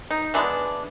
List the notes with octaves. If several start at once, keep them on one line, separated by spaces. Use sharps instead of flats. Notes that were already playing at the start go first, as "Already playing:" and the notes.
D#4
E3 G#3 B3 D4